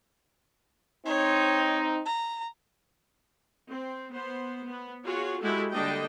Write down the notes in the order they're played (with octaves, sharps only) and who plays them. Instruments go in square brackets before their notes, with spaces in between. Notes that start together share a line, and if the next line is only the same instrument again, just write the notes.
[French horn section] C4 D#4 [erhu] C#5
[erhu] A#5
[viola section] C4
B3 C5
B3
F4 F#4 G#4 C#5
G#3 E4 F#4 G4 A4
D3 G3 A#3 D4 D#5 G5